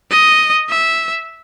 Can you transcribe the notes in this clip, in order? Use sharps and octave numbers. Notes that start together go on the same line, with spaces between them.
D#5
E5